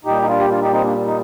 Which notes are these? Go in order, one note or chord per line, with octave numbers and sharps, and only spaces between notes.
A#2 G3 D#4 G4
D#4
D4 F4
G4
D4 F4
D#4 G4
C4 D#4
A#3 D4
D#4